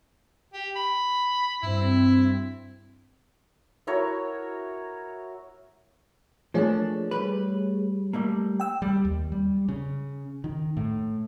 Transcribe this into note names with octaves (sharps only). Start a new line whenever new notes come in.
G4
B5
G2 C4 E4
E4 F#4 A#4 C#5
F3 A3 A#3 D4 G#4 C#5
G3 B4
G3 A3 A#3
G5 E6
G3
D#2
G3
C#3
D#3
A2